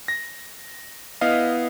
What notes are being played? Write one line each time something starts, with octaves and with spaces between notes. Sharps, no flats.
A#6
B3 E4 D#5 F5